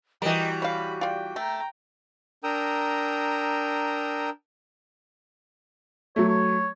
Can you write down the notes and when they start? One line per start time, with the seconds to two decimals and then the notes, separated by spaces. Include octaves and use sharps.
0.22 E3 G3 F#4 G4 A#4 D#5 G5
0.62 C#5 F5 B5
1.01 F4 D5 G5
1.36 A3 G5 A#5
2.44 D4 A#4 G5 A#5 D#6 E6
6.16 F#3 A3 C#5
6.28 C#5